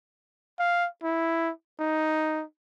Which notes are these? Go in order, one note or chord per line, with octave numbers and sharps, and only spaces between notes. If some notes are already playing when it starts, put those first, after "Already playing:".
F5
E4
D#4